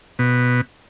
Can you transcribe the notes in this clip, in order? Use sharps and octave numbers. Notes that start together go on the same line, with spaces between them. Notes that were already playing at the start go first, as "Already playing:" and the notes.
B2